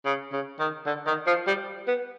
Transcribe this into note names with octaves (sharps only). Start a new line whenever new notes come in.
C#3
C#3
D#3
D3
D#3
F3
G3
B3